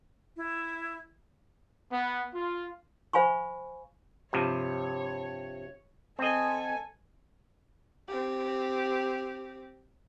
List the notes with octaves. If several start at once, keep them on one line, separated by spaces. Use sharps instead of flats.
E4
B3
F4
C5 F5 G#5 B5 C#6
G2 C3 F3 C#5
C4 A4 D#5 G#5
C4 G4